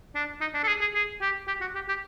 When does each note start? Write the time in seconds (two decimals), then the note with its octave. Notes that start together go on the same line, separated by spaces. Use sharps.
0.15 D4
0.41 D#4
0.54 D4
0.63 A4
0.68 G#4
0.81 G#4
0.95 G#4
1.21 G4
1.48 G4
1.61 F#4
1.75 G4
1.89 G4